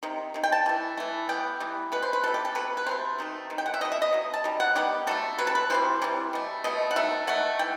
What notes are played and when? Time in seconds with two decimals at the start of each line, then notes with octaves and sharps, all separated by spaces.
0.03 C3 D#3
0.34 C3 D#3
0.44 G5
0.52 A5
0.66 E3 A3
0.97 E3 A3
1.29 E3 G3 B3 G5
1.60 E3 G3 B3
1.92 B2 A3 B4
2.03 C5
2.13 B4
2.24 B2 A3 A4
2.34 G4
2.45 A4
2.55 C3 F#3 B4
2.77 B4
2.86 C3 F#3 A3 C5
3.19 C3 D#3 A3
3.50 C3 D#3
3.58 G5
3.66 F#5
3.74 E5
3.81 B2 F#3 A3 D#5
3.92 E5
4.02 D#5
4.13 B2 F#3
4.34 A5
4.44 D#3 G3
4.60 F#5
4.75 D#3 G3 B3 G4
5.07 C3 F#3 A3 A4
5.38 C3 F#3 B4
5.47 A4
5.55 B4
5.70 C3 E3 G3 C5
6.02 C3 E3 G3
6.33 B2 A3
6.64 B2 A3 D#5
6.91 F#5
6.96 D#3 A3 E5
7.27 D#3 A3 F#5
7.59 E3 G5